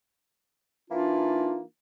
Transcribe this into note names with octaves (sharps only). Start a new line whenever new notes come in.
E3 A#3 D4 D#4 F4